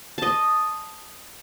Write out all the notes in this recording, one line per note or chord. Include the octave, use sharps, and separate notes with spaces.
D#5 A5